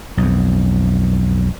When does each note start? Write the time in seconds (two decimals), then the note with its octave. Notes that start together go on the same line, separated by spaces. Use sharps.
0.17 B1 F2